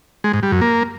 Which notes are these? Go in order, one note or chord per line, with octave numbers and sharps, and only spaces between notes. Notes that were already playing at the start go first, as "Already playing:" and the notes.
G#3
G#2
G3
F#2
A#3